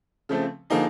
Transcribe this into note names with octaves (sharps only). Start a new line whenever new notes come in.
C#3 F3 A3 C4
D3 F3 A#3 D#4 G#4